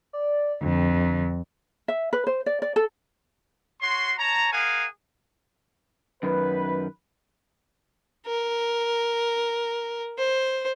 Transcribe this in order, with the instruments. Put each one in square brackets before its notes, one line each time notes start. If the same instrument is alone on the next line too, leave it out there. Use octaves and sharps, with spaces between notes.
[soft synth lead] D5
[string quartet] F2 [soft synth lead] D3
[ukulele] E5
B4
C5
D5
D5
A4
[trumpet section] F#4 C#5 C6
C#5 A5 A#5
G#4 A#4 F5 F#5 G#5
[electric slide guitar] F#2 D#3 [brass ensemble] B4
[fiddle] A#4
C5